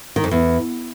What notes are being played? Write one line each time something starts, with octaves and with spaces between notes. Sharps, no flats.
D#3
F2
E2